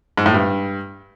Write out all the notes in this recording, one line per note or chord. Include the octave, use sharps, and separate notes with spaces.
G#2
A2
G2